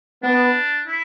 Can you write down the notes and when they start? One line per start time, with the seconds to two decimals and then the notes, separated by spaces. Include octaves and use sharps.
0.23 B3 D4
0.87 E4